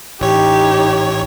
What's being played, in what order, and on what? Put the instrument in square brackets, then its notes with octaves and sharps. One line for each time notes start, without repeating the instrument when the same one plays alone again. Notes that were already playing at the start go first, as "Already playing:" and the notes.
[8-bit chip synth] A1 C#5 [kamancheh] D#4 G4